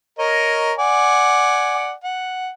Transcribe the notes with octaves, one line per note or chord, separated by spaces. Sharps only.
A#4 C#5 D#5
D5 F#5 G#5
F#5